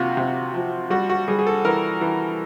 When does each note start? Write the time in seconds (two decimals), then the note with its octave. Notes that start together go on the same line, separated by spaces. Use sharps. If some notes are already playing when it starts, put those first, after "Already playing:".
Already playing: C3 A#3 F4 F#4
0.17 C3
0.54 F3
0.90 G3 F#4
1.09 F#4
1.28 G3 G#4
1.39 G#4
1.47 A4
1.65 E3 A#4
2.01 E3